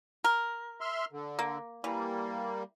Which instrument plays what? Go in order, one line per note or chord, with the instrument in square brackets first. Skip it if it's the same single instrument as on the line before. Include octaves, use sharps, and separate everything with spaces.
[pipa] A#4
[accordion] E5 C6 F6
D3
[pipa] A#3
[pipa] E3 [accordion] G3 A#3